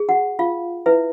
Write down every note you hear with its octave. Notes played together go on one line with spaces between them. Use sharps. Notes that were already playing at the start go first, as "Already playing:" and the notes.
Already playing: G#4
F#4 F#5
F4 F5
E4 B4 E5